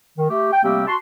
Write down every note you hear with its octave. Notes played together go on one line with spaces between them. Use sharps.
D#3
A3 G4
G5
C3 G3 A3 A#3 C4 G4
F#4 A5 C6